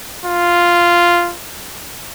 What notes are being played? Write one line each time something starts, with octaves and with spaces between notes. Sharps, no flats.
F4